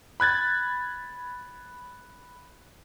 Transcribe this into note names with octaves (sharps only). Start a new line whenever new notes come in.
B5 F#6 G#6 A6